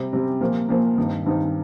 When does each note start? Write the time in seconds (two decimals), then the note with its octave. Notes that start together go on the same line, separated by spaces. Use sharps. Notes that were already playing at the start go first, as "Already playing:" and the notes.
Already playing: C3 G3
0.13 C3 G3 C4
0.41 A#2 F3 A#3
0.69 A#2 F3 A#3
0.97 G2 D#3 C4 D#4
1.26 G2 D#3 C4 D#4